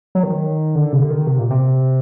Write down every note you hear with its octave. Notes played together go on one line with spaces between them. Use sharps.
F#3
D#3
D3
C3
D3
D#3
C3
A#2
C3